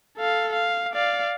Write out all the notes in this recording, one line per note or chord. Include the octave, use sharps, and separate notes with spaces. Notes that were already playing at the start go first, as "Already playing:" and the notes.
A4 F5
F5
D5 F5